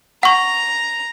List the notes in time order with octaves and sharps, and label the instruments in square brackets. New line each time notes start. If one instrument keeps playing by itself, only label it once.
[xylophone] F#5 C#6 [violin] A#5